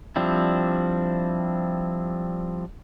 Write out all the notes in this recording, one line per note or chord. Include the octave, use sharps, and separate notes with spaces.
F3 G3 C4 D4 E4